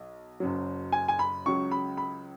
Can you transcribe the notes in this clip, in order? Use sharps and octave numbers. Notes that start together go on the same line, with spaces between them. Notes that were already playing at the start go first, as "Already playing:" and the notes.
Already playing: B1
F#1 F#2 F#3
G#5
G#5
B5
C#2 C#3 F#3 C#6
B5
B5